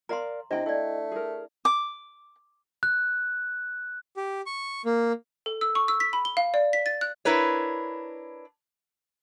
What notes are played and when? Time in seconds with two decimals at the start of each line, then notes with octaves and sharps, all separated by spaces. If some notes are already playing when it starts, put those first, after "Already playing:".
0.09 A#4 D5 F5 A#5 C6
0.51 C3 D4 E4 D#5 G5
0.66 A3 E4 D5
1.12 G#4 A#4
1.65 D6
2.83 F#6
4.17 G4
4.46 C#6
4.85 A#3
5.46 A4
5.61 E6
5.75 C#6
5.88 E6
6.00 B6
6.13 B5
6.25 G7
6.37 F5
6.54 D5
6.73 B6
6.86 A6
7.01 F#6
7.25 D4 E4 A#4 B4 C#5